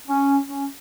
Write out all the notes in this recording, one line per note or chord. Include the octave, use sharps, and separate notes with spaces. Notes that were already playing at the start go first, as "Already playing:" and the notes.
C#4
C#4